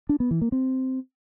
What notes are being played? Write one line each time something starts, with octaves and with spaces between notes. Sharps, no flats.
D4
B3
E3
A#3
C4